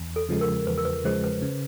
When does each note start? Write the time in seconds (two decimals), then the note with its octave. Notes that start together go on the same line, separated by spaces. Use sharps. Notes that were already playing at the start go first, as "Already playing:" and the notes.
Already playing: E2
0.16 A4
0.29 C#3 F3 G#3
0.41 A#4
0.67 E2 B4
0.78 A#4
0.85 B4
1.04 C#3 F3 G#3 C5
1.24 B4
1.42 C#3